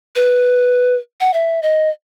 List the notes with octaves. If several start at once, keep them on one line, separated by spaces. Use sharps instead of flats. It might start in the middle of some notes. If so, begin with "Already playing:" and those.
B4
F#5
E5
D#5